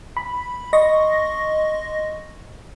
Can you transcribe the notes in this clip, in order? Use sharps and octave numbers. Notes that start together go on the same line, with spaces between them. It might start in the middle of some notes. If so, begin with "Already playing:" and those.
B5
D#5 C6 C#6 A#6